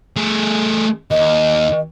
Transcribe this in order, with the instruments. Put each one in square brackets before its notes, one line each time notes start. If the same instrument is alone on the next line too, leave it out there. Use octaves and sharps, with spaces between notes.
[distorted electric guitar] A3 G#4
[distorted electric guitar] D#2 [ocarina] D#5